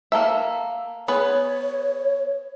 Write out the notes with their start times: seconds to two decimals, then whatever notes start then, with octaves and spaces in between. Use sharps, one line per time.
0.12 A#3 A4 E5
1.08 B3 G#4 B4 C#5